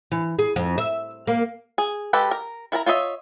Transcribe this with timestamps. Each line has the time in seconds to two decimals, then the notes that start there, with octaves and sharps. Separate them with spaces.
0.11 E3
0.39 G#4
0.56 F2
0.78 E5
1.27 A#3
1.78 G#4
2.13 G#3 G4 A4 B4
2.31 A#4
2.72 E4 A#4 A5 A#5
2.86 F4 C#5 D#5 E5